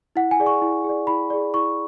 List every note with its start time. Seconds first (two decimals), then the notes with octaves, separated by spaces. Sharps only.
0.16 E4 F#5
0.31 G#5
0.40 G#4 D5
0.46 C#6
0.62 E4
0.84 G#4
0.89 D5
1.07 E4 B5
1.30 G#4 D5
1.54 E4 C#6